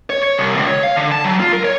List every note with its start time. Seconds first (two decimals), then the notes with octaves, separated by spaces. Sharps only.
0.10 C#5
0.23 C#5
0.38 C2
0.56 C#2
0.67 C#5
0.83 F5
0.96 D3
1.12 A5
1.24 F#3
1.40 F4
1.52 A#4
1.64 C#5